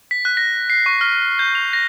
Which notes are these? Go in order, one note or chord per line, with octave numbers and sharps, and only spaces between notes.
B6
F#6
A#6
C7
C#6
F6
G6
F7
A#6